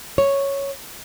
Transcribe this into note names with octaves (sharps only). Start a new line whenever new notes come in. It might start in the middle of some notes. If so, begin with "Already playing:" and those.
C#5